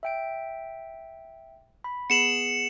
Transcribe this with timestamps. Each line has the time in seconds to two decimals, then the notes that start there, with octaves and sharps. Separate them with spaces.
0.03 E5 G5 D7
1.84 B5
2.10 B3 G#4 C7 C#7 E7 F#7